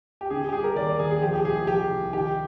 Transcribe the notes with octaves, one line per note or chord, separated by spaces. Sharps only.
G4
D3 G#4
G#4
G4
G3 G#4
A#4
D#2 D5
A#4
D#2 G#4
G#4
F3 G4
G#4
G4
C2 G#4
G#4
F3 G4
C2
D#3 G4